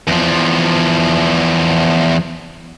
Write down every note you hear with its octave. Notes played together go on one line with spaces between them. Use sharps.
E2 F3